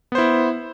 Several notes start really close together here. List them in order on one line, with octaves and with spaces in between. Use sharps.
B3 C5 E4